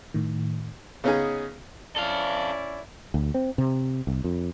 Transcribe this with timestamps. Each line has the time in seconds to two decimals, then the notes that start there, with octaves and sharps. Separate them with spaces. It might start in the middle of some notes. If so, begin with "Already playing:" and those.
0.14 A2 D#3
1.04 C#3 B3 C#4 D#4 G#4
1.96 C#4 E4 A4 D5 F5
3.14 D2
3.34 C4
3.58 C3
4.07 C2
4.24 F2